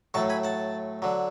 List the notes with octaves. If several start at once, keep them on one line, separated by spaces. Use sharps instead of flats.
A2 F#3 A3 A5 C#6
G#5 B5
F#5 A5
D3 F#3